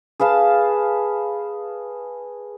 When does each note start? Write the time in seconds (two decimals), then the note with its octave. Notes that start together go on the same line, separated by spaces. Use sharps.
0.20 G#4 B4 F5 A5